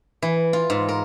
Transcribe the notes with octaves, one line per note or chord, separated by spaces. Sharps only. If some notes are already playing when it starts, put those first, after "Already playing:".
E3
F4
G#2
A#4